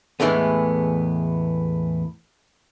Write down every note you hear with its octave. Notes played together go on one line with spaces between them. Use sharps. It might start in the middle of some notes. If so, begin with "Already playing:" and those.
E2 A2 E3 G#3 A3 B3